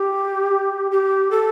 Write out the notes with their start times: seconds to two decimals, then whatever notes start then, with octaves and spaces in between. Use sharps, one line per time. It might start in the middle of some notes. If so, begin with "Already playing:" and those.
Already playing: G4
0.91 G4
1.31 A4